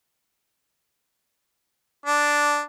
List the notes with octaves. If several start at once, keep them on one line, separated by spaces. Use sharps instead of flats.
D4